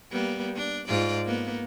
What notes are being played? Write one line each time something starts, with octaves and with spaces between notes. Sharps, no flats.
G3 A#3 B3
D4
G#2 F4 D5
A#3 B3